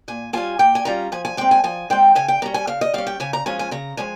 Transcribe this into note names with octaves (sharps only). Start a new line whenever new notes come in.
A#2 G#5
G3 C#4 F4 G#5
A#2 G5
G#5
G3 C#4 F4 A#5
F3 G#5
G#5
G#3 C4 G5
G#5
F3 G#5
G#3 C4 G5
C#3 G#5
G5
G3 C#4 A#5
G#5
C#3 F5
D#5
G3 C#4 F5
G5
C#3 G#5
A#5
F3 G#3 C#4 F4 G#5
G#5
C#3 A#5
F3 G#3 C#4 G#5